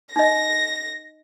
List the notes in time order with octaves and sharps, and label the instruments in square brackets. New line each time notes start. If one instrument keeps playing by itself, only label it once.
[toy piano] D#4 D#5 [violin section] A#6